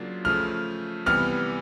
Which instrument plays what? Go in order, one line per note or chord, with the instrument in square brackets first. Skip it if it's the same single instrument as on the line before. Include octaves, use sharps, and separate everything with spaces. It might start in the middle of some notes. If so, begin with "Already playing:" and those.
Already playing: [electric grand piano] C#3 F#3 A#3 D4 F4
[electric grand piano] C#3 F3 A3 [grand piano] F6
[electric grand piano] C3 E3 G3 B3 [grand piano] F6